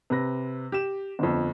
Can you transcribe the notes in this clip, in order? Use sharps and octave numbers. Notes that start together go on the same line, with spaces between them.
C3 B4 A#6
G4 E7
G1 F2